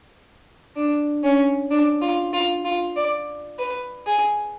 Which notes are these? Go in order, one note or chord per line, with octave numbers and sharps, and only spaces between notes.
D4
C#4
D4
F4
F4
F4
D5
B4
G#4